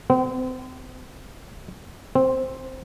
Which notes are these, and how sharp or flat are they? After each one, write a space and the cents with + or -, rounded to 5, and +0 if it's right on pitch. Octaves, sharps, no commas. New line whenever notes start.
C4 -35
C4 +5